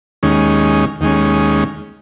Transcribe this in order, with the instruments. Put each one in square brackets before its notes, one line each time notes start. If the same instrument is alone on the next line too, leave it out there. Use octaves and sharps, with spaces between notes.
[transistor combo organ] D#2 D#3 G#3 C#4
D#2 D#3 G#3 C#4